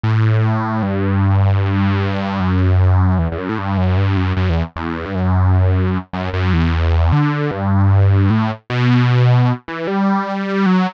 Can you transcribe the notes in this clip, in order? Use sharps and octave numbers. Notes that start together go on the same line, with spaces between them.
A2
G2
F#2
E2
E2
F#2
A2
G2
F#2
G2
F#2
F#2
E2
E2
G2
F#2
F#2
F#2
E2
D3
G2
A2
B2
E3
G3
F#3